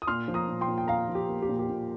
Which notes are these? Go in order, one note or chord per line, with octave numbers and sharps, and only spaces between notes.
D#6
A#2 C6 F6
F3
A#5 D#6
A#2
G5 C6
A#2
G5
A#2 F5 A#5
F3
G4
A#3
G4
A#2
G4
A#2